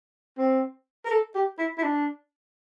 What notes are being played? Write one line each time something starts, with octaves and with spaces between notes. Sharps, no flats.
C4
A#4
A4
G4
E4
E4
D4